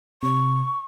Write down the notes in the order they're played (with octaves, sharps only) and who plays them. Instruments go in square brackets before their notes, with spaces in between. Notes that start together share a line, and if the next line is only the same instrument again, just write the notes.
[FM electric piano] C3 [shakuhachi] C#6